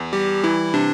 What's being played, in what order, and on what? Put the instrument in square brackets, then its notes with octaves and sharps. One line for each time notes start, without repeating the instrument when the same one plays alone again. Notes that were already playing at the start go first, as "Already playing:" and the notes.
Already playing: [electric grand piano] E2
[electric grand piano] G3 [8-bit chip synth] G4
[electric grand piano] E3 [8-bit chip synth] E4
[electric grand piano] C3 [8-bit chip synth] D4